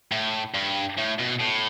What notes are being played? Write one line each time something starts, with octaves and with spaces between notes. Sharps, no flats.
A2
G2
A2
B2
A2